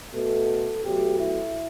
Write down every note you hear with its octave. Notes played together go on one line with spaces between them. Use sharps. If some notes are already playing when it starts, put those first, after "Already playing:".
B2 A3 A4
B2 F#3 A3 G4
E4